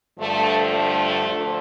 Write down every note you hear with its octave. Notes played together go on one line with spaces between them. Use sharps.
G2 D3 F3 A3
A3
D2 D3 F3